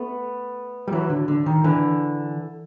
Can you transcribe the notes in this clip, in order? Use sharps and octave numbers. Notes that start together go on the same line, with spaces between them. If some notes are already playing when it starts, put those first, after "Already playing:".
Already playing: A3 B3
G3
E3 F#3
D3
D3
D#3
D3 E3